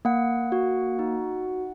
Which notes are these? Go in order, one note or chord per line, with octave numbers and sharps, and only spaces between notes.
A#3 F#5
F#4
D#4
D#4